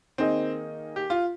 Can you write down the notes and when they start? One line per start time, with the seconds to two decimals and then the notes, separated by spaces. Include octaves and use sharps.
0.18 D#3 A#3 C4 D#4 G#4 D#5
0.96 G4
1.10 F4